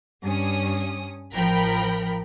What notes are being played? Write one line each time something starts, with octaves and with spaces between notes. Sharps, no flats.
G2 C#4 D#6
A1 F3 A#4 G5 B5